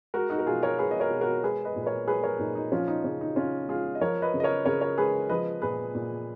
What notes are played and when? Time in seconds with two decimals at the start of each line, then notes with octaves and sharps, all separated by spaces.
0.14 G#3 F#4 A#4
0.30 D#4 F#4
0.39 A#4
0.46 B2 F4 G#4
0.63 A#4 C#5
0.78 G#3 G#4 B4
0.91 D#5
1.00 A#4 C#5
1.10 B2
1.21 F#4 A#4
1.43 G#3 G#4 B4
1.65 B4 D#5
1.76 A#2
1.81 B4
1.86 A#4 C#5
2.07 G#3 G#4 B4
2.23 A#4 C#5
2.39 A#2 D#4
2.55 D#4
2.72 F3 C#4 F4
2.88 D#4
3.04 C#3 C#4
3.21 D#4
3.36 C#3 C#4 F4
3.68 G#3 F4 G#4
3.95 D#5
4.01 F3 A#4 C#5
4.22 B4 D#5
4.34 C#3
4.40 D#5
4.43 A#4 C#5
4.65 C#3 A#4 C#5
4.81 A#4 C#5
4.98 G#3 G#4 B4
5.29 F3 B4 D#5
5.62 A#2 G#4 B4
5.95 A#2